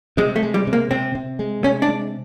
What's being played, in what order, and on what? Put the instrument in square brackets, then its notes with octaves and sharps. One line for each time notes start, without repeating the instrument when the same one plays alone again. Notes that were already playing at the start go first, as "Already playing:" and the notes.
[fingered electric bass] C3 [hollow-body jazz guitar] G#3
[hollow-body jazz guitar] A3
[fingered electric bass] G#3
[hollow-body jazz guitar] G3
[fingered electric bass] C3
[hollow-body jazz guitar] A#3
[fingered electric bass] C3 [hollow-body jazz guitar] C4
[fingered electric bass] C3
G#3
[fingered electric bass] C3 [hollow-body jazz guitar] C#4
[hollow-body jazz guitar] D4
[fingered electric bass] G#3